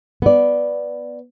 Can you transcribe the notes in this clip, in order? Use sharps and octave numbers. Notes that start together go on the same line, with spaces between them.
B3 D5